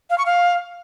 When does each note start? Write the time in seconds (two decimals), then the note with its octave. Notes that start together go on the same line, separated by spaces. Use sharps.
0.10 F5
0.18 C#6
0.26 F5